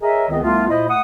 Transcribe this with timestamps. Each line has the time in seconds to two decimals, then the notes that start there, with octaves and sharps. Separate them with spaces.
0.03 G#4 A#4 C#5 D#5 E5
0.29 C#2 D#3 B3 C4 G#4 D#5
0.43 C2 A3 B3 F4
0.69 A#2 E4 C5 D#5
0.88 A3 F#5 D#6